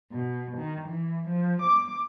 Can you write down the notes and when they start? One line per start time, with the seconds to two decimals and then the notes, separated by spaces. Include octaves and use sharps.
0.11 B2
0.57 D#3
0.88 E3
1.28 F3
1.61 D6